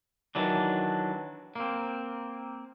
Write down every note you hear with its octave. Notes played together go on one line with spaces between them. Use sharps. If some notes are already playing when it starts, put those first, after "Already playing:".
D#3 E3 F#3 D4
A#3 C4